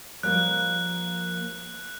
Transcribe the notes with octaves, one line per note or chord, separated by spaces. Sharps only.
F3 G3 A#3 F#6